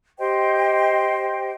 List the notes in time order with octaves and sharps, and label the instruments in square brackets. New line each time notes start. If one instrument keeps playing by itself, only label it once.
[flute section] G4 C5 D#5 G5